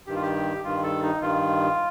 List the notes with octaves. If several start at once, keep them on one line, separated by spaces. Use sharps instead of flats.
G2 D#3 G4
F4
G4
G2 D#3 F4
A4
D#4
G2 D#3 F4